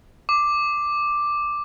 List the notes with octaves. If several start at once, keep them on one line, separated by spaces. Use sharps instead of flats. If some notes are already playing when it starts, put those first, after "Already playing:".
D6